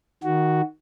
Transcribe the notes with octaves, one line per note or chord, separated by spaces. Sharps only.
D#3 F#4